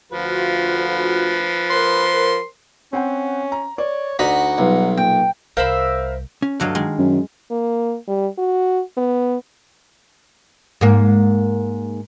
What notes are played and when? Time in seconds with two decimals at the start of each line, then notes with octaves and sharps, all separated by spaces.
0.12 D2 F3 F4 F#4 B4
1.70 A#4 C5 C6
2.93 C4 C#4 F#5 G5
3.52 A#5
3.78 C#5 D5
4.19 D2 D#4 F#4 D5 F#5 B5
4.58 B1 G3 B3 F4
4.97 A#2 G5
5.57 C2 A#4 C5 E5 F5 B5
6.42 C#4
6.60 D2 G2 D3 F#3 D#5 F5
6.75 D#3 G#3
6.98 F#2
7.51 A#3
8.07 G3
8.38 F#4
8.97 B3
10.81 G#2 A#3